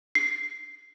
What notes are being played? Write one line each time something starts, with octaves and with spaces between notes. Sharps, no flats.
C7